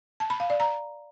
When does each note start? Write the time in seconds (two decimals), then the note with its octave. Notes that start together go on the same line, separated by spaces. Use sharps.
0.20 A5
0.30 B5
0.40 F5
0.50 D5
0.60 A#5